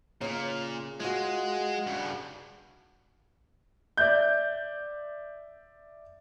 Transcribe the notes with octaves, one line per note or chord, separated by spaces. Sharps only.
A#2 C#3 A#3
G#3 F4 F#4
G2 C#3
D5 E5 G6